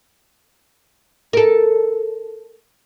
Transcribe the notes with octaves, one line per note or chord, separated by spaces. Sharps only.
A4 A#4